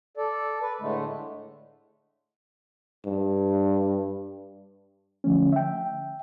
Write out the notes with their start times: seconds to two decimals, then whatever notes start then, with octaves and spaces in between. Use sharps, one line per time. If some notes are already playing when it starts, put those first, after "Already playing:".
0.17 A4 D5
0.62 B4
0.80 A2 D3 G#3 A3
3.06 G2
5.24 D3 F3 A3 C#4
5.53 E5 G5